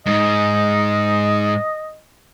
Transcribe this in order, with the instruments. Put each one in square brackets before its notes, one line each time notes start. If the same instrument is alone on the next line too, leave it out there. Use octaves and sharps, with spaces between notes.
[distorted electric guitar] G#2 [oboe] D#5